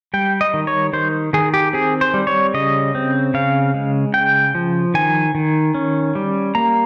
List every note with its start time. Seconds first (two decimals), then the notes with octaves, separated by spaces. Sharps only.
0.14 G3 G5
0.41 D#5
0.54 D#3
0.67 C#5
0.93 D#3 C5
1.33 D#3 G#4
1.54 G4
1.73 C4 G#4
2.01 C5
2.14 G3
2.27 C#5
2.54 C#3 D#5
2.95 C4
3.34 C#3 F5
3.74 G#3
4.14 C#3 G5
4.55 F3
4.94 D#3 G#5
5.35 D#3
5.75 C#4
6.15 G3
6.55 A#3 A#5